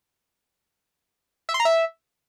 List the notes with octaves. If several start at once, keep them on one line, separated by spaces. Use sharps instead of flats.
E5
C6
A#5
E5